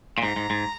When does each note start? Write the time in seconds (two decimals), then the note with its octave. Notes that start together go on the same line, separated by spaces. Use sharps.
0.18 A#2
0.22 G#2 A#5
0.36 G#2
0.50 G#2